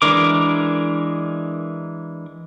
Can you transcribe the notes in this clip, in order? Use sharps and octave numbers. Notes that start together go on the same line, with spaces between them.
E3 G#3 D4 A#4 D6